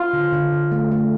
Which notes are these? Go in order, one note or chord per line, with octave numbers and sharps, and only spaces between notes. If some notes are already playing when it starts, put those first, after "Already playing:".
Already playing: F4
D3
D3
D3
A3
A3